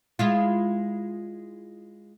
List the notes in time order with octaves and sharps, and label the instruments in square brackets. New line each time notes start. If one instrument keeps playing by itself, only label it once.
[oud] G#3 E4 F4